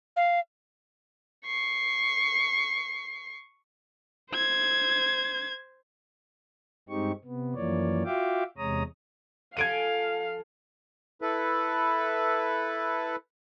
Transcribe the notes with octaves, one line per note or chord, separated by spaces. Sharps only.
F5
C#6 C7
C5 G#6
G2 G#3 C4 D#4 G4 C#6
C3 B3
F#2 E3 F3 A#3 C#5 D5
F4 F#4 E5 F5 G5 D6
E2 C3 G#3 C#5 A#5 D#6
F3 A4 F5 G#5 G#6 D7 D#7
E4 A4 B4